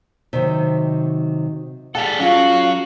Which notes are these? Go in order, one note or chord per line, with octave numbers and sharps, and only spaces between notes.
C3 D#3 F#3
G3 G#4 A4 F#5
F#3 C#4 F4 F#4 F5